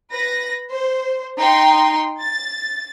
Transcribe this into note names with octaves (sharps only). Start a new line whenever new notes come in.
B4 A#6
C5
D#4 G5 C6
A6